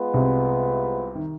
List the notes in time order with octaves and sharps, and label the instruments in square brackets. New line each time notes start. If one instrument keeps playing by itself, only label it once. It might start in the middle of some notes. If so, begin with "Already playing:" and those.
Already playing: [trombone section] G#3 B3 F4 B4
[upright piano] C2 C3
D#3